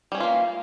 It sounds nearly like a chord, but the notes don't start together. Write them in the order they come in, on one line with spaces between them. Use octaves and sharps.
G3 C#4 E3 F4 A#3